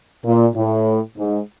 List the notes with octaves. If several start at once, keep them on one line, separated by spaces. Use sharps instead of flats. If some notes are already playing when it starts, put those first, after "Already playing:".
A#2
A2
G#2